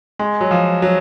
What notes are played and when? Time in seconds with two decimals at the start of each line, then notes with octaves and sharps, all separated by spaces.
0.19 G#3
0.41 F#3
0.51 F3
0.82 F#3